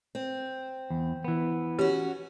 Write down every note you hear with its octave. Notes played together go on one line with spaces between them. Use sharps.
C4
E2
E3 B3
C#4 F#4 G4